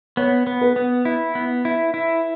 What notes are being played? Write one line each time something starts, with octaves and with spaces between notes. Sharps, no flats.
B3 C#5
B3
B4
B3
E4
B3
E4
E4